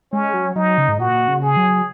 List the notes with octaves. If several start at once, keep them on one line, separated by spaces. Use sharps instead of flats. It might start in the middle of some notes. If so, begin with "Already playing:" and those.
G#3 C#4
F#3
F#3 D#4
C#3
G#2
A#2 F#4
C#3
G#4
F#3